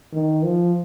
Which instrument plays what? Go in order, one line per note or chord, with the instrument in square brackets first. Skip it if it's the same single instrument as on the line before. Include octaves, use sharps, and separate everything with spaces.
[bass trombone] D#3
F3